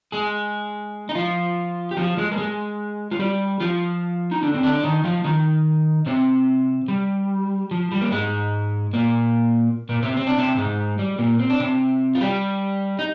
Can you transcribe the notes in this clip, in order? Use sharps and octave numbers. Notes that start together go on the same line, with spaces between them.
G#3 G#4
D#4
F3 F4
G4
F3 F4
G#3 G#4
A#4
G#3 G#4
F4
G3 G4
F3 F4
D#4
D3 D4
C4
D3 D4
D4
D#3 D#4
F3 F4
D#3 D#4
C3 C4
G3
F3
G3
A#3
G#2 G#3
A#2 A#3
A#2 A#3
C3 C4
C4
D4
C3 C4
G#2 G#3
G3
A#2 A#3
C4
D4
C3 C4
F4
G3 G4
D#4